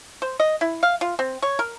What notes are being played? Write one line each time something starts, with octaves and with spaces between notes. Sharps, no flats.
C5
D#5
E4
F5
F4
C4
C#5
A#4